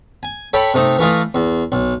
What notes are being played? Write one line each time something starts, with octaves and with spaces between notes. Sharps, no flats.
G#5
A4 C#5 G5 B5
C3 A3 D#4
E3 A3 F4 D#5
E2
B1